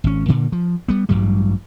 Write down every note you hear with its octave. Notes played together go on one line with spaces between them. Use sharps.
G#1 C#4
G2 A#2 D3
F3
G3 B3
A1 G2 F#3 G3